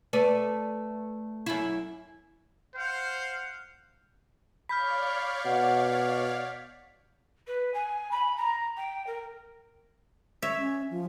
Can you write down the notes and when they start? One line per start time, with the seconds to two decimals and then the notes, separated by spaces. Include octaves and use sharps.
0.13 A3 B4 D5
1.46 F#2 E4
2.75 C5 F5 F#5
4.69 C#5 D5 F5 B5 F6 G6 B6
5.45 B2 F#5
7.47 B4
7.74 G#5
8.11 B5
8.37 A#5
8.77 G5
9.06 A#4
10.42 C#5 E5
10.58 C#4
10.90 F3